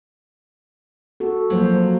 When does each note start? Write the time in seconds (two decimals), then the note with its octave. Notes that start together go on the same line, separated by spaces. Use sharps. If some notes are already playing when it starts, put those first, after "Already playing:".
1.20 F#4 A4
1.50 F3 F#3 A#3 C5